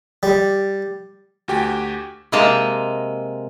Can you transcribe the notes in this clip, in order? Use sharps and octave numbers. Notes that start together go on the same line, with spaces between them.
G3
D2 F#4 G4 G5 G#5
C3 G#3 A#3 D#5 A5 A#5